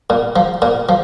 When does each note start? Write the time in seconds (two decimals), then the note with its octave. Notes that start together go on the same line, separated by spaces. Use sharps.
0.10 A#2
0.36 F3
0.62 A#2
0.89 F3